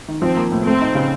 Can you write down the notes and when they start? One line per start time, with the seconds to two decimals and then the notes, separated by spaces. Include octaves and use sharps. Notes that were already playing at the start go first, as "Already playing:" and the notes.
0.08 D#3
0.22 F3 C4
0.37 A#3
0.52 A2
0.66 A3 C4
0.81 D#4
0.95 C#3